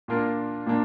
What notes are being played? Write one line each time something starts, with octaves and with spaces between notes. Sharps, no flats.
A#2 A#3 D4 F4 A#4
A#2 A#3 D4